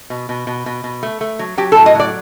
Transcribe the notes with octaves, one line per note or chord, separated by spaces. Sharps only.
B2
B2
B2
B2
B2
A3
A3
F#3
F#3 G4
A4
A2
D#5
F#3 D5